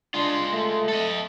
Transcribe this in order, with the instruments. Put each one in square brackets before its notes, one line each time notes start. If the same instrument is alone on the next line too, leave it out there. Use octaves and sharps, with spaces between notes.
[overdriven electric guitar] G#3 F4 [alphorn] D4
[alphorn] A3
[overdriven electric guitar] A4 D#5